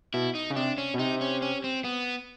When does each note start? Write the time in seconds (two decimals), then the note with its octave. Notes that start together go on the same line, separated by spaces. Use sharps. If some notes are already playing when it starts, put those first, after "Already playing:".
0.14 B2 E4
0.35 D#4
0.50 C#3
0.56 C3 D4
0.78 C#4
0.94 B2
0.99 C3 D#4
1.21 C#4
1.42 C#4
1.64 C4
1.84 B3